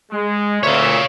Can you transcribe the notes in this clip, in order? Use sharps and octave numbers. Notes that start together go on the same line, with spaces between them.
G#3
D2 A#2 C#5 E5 F5